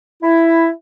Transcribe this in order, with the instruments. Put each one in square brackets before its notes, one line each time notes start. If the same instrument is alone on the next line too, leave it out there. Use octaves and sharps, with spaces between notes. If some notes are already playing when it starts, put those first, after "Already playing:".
[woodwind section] E4